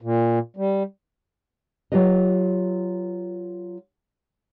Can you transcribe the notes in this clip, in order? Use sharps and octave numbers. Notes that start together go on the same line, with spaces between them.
A#2
G3
F#3 F4 G4 B4 D#5